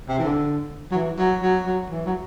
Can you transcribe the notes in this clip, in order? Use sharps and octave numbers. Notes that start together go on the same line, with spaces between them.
C3
E3
D3
F#3
E3
F#3
F#3
F#3
E3
F#3